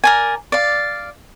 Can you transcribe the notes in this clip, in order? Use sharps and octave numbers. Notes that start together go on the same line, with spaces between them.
A#4 D5 G#5
D5 F5